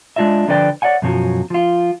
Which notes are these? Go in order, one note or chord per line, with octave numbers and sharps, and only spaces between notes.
G#3 D4 F4 D#5 E5
D3 F3 D4 B4 D5 G5
C#5 D5 E5 F#5 G#5
F#2 B2 F3 F#3 C#4
F3 F4